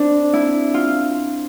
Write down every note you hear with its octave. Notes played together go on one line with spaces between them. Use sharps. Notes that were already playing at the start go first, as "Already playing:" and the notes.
Already playing: C4 D4
E4
F4